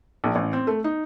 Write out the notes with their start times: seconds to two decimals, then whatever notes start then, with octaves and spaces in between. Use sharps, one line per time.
0.24 A#1
0.35 A1
0.53 C4
0.67 A3
0.84 D#4